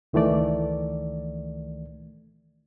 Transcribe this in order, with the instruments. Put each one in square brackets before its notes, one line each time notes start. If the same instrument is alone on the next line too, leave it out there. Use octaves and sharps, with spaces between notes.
[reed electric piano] C#2 D#3 E3 A3 D5